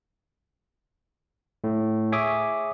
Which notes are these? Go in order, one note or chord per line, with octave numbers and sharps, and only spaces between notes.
A2
G#4 C#5 E5 D6 D#6